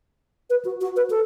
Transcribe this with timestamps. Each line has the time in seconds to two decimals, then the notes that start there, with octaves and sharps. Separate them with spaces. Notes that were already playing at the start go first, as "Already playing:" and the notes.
0.50 B4
0.65 F#4
0.81 F#4
0.96 B4
1.10 A4